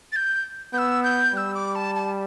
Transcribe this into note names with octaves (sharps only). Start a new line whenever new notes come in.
A6
G6
B3 G6
E6
G6
G3 E6 G6
D6
A5
A5